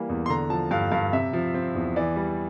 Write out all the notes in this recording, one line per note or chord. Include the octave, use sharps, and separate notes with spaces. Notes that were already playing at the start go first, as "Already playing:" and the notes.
Already playing: E3 G3 A#3
E2
C6
D3 A#5
F3 A5
G2 F5
G2 F5
C3 E5
F3
C4
E2
E3 D5
G3